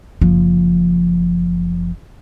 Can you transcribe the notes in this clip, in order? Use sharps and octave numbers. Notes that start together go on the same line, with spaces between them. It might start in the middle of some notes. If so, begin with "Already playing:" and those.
F#1 F3